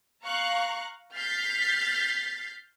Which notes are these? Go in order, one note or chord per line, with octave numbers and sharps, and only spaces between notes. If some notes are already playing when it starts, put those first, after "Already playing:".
F5 A#5 C#6 F#6
F6 G6 A6 B6 C7